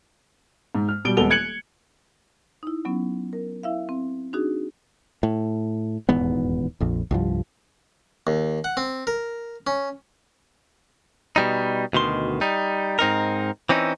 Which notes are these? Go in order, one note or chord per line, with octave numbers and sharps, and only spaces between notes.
G#2
F6
B2 G3 D7 G7
D#1 G#3 B3 A4 F7 G7
F#6 G#6 C#7 F#7
D#4 E4
F#3 B3 C#4
A#4
E4 E5 F5
C4
D4 D#4 F#4 G#4
A2
D#1 E2 G#2 B3
A#1 F2
C2 G2 F3
D#2
F#5
C4
A#4
C#4
B2 G3 D#4
D2 B2 D#3 C6
G3 D#4
G#2 C4 D#4 A#4
E3 C4 C#4 D#4